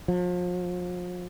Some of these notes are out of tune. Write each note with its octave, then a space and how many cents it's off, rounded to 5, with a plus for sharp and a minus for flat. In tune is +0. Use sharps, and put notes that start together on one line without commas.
F3 +35